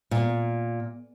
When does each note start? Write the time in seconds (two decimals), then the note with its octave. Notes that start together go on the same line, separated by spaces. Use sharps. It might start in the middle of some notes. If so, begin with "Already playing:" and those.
0.11 A#2